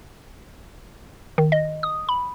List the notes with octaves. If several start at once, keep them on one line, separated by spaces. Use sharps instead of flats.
D#3
D#5
D#6
B5